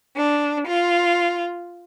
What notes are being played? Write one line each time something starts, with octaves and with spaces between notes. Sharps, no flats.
D4
F4